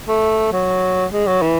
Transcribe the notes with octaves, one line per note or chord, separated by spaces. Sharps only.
A3
F#3
G#3
F#3
E3